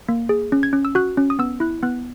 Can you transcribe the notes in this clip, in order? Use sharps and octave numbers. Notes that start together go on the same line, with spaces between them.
A#3
G#4
C#4
G#6
C#4
E6
F#4 F#6
C#4
D#6
B3 E6
E4 F#6
B3 F#6